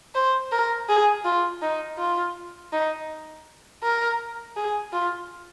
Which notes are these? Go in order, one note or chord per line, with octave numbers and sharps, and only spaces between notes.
C5
A#4
G#4
F4
D#4
F4
D#4
A#4
G#4
F4